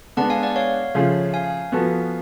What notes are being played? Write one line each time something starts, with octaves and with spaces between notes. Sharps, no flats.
D3 G#3 B3 D4 F#5 A5
F5 G#5
D5 F#5
C#5 F5
C#3 F3 A3 F4 G#4
F5 G#5
F3 B3 F#4 A4